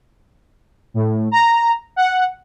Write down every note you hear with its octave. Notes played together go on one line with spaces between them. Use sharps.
A2
A#5
F#5